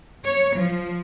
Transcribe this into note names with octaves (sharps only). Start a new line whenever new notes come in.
C#5
F3